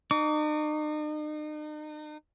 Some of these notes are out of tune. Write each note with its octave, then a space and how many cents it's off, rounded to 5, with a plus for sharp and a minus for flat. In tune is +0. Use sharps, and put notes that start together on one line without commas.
D#4 -40 D6 -45